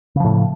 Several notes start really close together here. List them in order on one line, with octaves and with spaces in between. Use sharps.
C#3 F3 A2